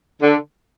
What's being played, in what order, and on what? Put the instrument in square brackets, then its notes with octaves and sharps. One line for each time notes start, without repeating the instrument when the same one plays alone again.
[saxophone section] D3